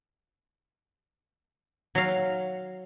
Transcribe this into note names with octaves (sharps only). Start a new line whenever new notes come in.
F#3 F5